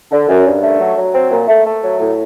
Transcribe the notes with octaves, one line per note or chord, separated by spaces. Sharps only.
D3
F#2
G2
A3
F#3
F#3
C4
A#2
A3
A3
F#3
A2